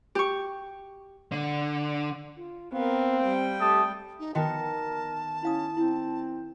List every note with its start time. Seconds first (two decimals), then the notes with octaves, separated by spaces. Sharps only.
0.15 G4 C#6
1.32 D3
2.37 F4
2.73 B3 C4 A#4 F5
3.20 G3 G5
3.60 A3 G4 A5 D#6
4.20 D#4
4.35 D#3 B3 F#4 A#4 D#5 G5 A5
5.43 C#4 E4 F5 D#6
5.77 C4 E4